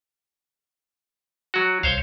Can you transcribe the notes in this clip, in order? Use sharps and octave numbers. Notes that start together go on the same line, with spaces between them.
F#3 F#4
C2 C5 C#5 F5